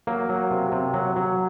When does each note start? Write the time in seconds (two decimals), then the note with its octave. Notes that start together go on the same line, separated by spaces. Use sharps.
0.07 F#3 A#3
0.29 F#3
0.51 C3
0.72 C3
0.94 F#3
1.16 F#3